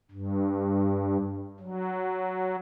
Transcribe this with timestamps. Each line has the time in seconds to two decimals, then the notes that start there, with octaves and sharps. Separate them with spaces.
0.11 G2
1.60 F#3